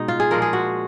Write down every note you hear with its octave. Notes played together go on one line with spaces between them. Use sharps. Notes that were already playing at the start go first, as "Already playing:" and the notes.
Already playing: B2 G#3 D#4
F4
G#4
A#2 F3 G#3 A#4
G#4
F#4